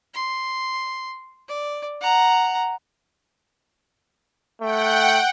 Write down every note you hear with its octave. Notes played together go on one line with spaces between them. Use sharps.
C6
D5
F#5 A#5
A3 F#5 G5